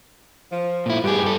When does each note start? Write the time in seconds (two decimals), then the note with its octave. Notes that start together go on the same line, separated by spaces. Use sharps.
0.51 F3
0.86 A#2 E4
1.04 G2 B3 G4 G#4
1.22 G2 A4